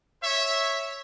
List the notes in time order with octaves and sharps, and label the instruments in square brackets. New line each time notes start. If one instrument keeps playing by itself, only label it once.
[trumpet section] C#5 E5